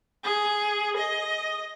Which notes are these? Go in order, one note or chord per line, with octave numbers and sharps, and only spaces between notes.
G#4
D#5